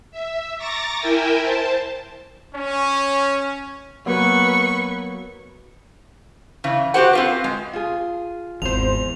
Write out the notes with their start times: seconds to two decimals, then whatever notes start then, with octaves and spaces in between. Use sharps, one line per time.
0.11 E5
0.58 A#5 C#6 D6 A6 A#6
0.99 E4 A#4 E5 G5 G#5
1.42 C5 A5
2.55 C#4
4.06 F#3 A#3 B3 B4 C#6
6.64 C#3 E3
6.94 F#4 G4 C5 F#5
7.13 C4 F4 B4
7.44 G#3
7.73 F4 G#4
8.62 G#1 E2 C5 F7